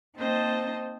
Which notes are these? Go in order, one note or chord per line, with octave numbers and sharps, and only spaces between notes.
A#3 C4 D#4 C5 D#5 A5